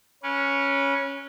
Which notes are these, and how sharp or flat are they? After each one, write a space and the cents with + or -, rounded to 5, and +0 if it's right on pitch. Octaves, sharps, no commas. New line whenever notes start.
C#4 +0 B4 -30